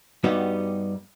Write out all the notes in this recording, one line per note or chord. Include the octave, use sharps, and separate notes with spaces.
G2 G3 B3 D#4 F#4 G4